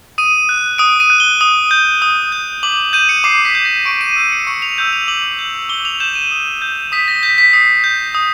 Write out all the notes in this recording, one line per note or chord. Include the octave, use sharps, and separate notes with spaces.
D#6 D#7
F#6
D#6 D7
D#7
F#6
G7
D#6
G6
D#6
G6
D6 F#7
G6 D#7
C#7
D6 C7
B6
G6
A#6
C#6 D7
D#7
E6 G6
C#7
C#6 C#7
F7
E6 G6 F7
F7
D6 F#7
G6
D6 G7
F7
G6 E7
D#7
D#6
G6
D#6 B6
A#6
G6 B6
B6
D#6 C7
G6
D#6